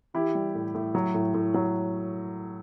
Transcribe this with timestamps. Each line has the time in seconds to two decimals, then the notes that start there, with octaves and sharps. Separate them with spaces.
0.14 E3 E4 G4
0.35 G3
0.55 A2
0.75 A2
0.95 F#3
1.14 A2
1.34 A2
1.54 F#3